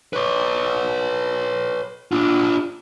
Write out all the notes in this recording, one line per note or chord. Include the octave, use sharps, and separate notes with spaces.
B4 C#5
D4 F4